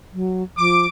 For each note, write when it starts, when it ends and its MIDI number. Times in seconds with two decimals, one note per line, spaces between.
0.13 0.43 54
0.57 0.86 53
0.57 0.86 86